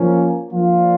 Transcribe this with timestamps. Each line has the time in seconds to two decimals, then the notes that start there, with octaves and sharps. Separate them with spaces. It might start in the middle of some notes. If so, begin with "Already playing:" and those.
Already playing: F3 A#3 C#4
0.51 F3 A#3 D4 F4